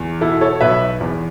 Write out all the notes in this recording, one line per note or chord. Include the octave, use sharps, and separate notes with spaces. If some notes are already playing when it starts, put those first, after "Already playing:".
Already playing: E2
B2 E4 A4
A4 C#5
B1 B4 E5
E2